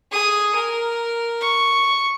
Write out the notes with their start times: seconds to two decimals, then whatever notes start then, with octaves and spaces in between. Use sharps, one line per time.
0.12 G#4 D#6
0.55 A#4
1.41 C#6